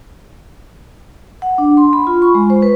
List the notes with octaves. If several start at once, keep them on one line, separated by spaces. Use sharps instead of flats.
F#5
D4
C6
B5
F4
C#6
G#3
C5
B4